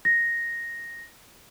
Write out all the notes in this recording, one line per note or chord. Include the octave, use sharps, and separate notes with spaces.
A#6